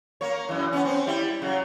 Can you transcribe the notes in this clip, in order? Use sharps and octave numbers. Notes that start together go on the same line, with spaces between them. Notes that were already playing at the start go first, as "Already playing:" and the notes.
A#3 C#5
F#2 E3
B3 C#4
C4 C#4
G3 E4
C#3 F#3